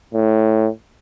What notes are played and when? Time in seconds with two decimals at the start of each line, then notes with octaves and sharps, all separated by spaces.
0.14 A2